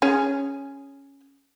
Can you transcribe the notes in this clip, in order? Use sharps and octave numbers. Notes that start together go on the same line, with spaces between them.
C#4 G#4